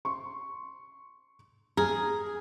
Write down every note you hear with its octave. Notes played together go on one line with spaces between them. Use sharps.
C6 C#6
G#4 A#5 F6 G#6